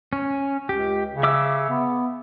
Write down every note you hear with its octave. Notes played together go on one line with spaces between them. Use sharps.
C#4
C#2 G4
C#3
E5 D6 E6
B3